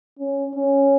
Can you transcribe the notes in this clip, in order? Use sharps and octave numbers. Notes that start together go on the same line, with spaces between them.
C#4
C#4